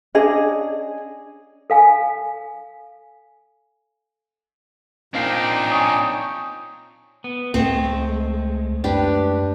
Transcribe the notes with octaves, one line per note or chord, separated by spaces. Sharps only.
C#4 D4 G#4 D#5
A4 F5 G#5
A#2 A#3 C4 D4 D#4 F5 G5 C7
C#5 G#5 D#6
B3
C#2 G#3 A3 C4
F#2 D4 G4 B4